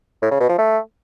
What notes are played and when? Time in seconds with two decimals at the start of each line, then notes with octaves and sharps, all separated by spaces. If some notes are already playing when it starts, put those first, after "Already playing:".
0.22 A2
0.31 C#3
0.40 B2
0.49 F3
0.58 A3